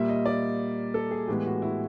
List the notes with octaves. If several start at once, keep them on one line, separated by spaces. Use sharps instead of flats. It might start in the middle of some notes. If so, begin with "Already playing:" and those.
Already playing: A#2 G3 A#3 E5
D#5
D5
A4
G#4
A2 E3 G#3 B3 G4
F#4
E4